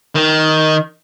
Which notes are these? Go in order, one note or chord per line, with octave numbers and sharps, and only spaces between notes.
D#3